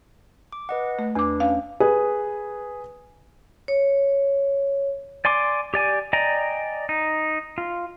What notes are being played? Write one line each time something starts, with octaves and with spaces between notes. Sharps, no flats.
D6
B4 D#5 F#5
A3
E2 D4 B4 D6
C#4 F5
G#4 B4
C#5
D5 G#5 C6 D6
G4 D5 G#5
D5 D#5 G5 G#5 A#5
D#4
F4